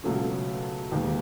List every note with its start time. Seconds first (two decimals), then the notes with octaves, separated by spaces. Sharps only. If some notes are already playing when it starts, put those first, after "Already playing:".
0.04 C#2 B2 F#3 A3 C#4
0.91 E1 D#2 D#3